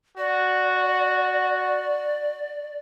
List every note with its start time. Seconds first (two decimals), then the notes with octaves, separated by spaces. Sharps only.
0.18 F#4 D5